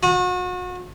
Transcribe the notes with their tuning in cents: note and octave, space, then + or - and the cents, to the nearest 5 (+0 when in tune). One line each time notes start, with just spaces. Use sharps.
F#4 -35